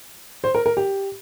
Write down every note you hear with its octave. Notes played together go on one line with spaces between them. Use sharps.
C5
A#4
A#4
G4